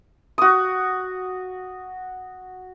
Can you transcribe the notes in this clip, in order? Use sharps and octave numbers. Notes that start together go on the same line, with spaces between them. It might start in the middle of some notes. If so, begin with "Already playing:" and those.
F#4 D#6